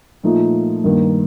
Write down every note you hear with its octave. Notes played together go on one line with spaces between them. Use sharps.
A#2 F3 A3 D#4
G2 D#3 A#3